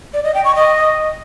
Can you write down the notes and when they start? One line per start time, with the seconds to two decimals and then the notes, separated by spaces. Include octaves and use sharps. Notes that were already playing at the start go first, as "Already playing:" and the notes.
0.14 D5
0.24 D#5
0.34 G5
0.45 C#6
0.55 D#5